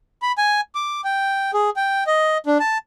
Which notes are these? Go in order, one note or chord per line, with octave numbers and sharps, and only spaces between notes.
B5
G#5
D6
G5
G#4
G5
D#5
D4
A5